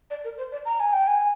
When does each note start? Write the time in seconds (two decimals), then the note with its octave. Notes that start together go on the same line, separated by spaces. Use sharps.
0.11 D5
0.24 A#4
0.38 C5
0.52 D5
0.65 A#5
0.80 G#5
0.93 G5
1.07 G#5